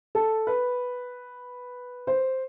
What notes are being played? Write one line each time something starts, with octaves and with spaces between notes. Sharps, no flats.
A4
B4
C5